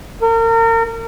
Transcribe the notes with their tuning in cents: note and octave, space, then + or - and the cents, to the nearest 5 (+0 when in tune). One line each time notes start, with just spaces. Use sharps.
A#4 -35